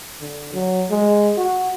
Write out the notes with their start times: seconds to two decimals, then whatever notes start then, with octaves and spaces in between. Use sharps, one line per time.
0.21 D3
0.54 F#3
0.90 G#3
1.37 F#4